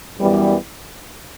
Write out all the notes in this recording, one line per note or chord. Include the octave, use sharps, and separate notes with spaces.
F#2 E3 G3 B3